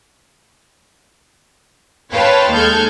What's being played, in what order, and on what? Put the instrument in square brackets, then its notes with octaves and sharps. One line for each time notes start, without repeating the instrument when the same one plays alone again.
[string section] B4 C#5 F5 G5 A5 C6
D#2 G#3 A4 F6 G6 G#6